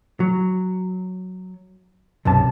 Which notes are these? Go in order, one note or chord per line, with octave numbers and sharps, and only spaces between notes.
F#3
B1 F#2 C3 A5